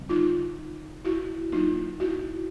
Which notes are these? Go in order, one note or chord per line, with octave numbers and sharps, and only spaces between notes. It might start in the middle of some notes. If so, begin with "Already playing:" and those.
Already playing: D3 G3 C4
D#4 F4
E4 F#4
F#3 A#3 D4 D#4 F4
E4 F#4